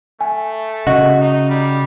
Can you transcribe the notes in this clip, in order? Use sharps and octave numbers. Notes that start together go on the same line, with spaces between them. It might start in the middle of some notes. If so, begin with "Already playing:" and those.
A3 G#5
C#3 F#4 D#5
D#4
G3